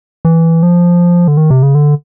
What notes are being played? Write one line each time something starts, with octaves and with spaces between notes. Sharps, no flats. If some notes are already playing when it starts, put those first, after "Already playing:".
E3
F3
D3
D#3
C3
C#3
D3